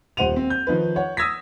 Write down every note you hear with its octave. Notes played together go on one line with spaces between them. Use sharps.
D#1 C5 F#5 D#7 F7
C4
G6
D#3 F3 D#4 B4
C#5 F#5
D#6 E6 G#6 A#6 B6